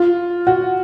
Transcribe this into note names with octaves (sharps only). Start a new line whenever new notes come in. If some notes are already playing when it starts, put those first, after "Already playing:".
Already playing: F4
F#4